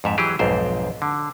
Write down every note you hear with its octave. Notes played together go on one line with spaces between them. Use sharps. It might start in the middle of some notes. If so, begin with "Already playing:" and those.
F2 G#2 E5
E3 F#3 G4 G#4
B1 F2 G#2 C5
D3